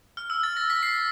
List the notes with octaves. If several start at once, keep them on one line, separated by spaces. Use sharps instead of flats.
F6
E6
A6
A#6
B6
C7